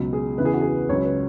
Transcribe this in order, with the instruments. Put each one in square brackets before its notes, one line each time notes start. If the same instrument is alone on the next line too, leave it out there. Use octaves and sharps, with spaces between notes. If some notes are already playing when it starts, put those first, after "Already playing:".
Already playing: [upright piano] C#2 B2 F#3
G#4
E2 C#3 E3 B4
G#4
F#4
G#4
C#2 C#3 F#3 C#5
B4